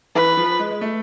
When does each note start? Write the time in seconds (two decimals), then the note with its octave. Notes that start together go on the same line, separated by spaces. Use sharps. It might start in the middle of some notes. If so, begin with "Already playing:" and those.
0.15 E3 B4
0.37 F3
0.59 G#3
0.71 G#3
0.81 A3